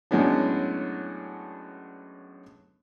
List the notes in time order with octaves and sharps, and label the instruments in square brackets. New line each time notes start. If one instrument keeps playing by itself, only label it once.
[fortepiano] F#2 A2 G#3 B3 C#4 D4